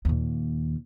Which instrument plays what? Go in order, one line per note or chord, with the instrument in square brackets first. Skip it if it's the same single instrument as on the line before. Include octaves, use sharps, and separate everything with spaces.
[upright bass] D#2 A#2